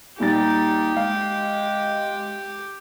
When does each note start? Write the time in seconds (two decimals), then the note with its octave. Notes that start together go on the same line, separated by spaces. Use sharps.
0.20 A#2 G3 D#4 G4 A6
0.97 G#3 F5